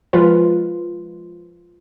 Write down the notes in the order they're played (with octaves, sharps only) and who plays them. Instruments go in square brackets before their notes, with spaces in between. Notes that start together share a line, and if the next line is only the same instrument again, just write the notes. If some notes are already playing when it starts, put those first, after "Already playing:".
[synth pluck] F3 G#3 F4 B4